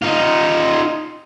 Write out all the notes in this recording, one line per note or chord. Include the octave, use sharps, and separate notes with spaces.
D#4 F4